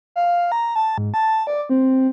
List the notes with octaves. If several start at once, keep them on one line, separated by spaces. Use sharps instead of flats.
F5
A#5
A5
G#2
A5
D5
C4